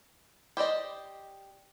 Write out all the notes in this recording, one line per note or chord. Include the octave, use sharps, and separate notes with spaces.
G4 C5 D5 D#5